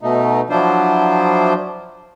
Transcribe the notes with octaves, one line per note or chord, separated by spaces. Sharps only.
B2 A3 D#4
F3 F#3 D4 E4 F4 C5